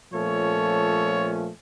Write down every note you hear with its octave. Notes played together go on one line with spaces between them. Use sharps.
A#2 F3 A3 C#4 A4 C#5